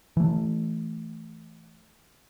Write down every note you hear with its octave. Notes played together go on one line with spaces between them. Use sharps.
E3 A3